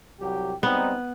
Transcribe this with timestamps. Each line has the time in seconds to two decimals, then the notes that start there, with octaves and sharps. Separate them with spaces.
0.20 C2 F#3 G4
0.63 G3 B3 C4 D#4